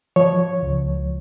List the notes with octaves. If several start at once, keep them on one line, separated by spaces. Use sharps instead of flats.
F3 C#5
C#2